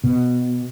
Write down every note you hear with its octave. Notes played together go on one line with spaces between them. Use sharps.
B2